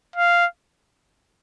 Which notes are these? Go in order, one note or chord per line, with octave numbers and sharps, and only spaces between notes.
F5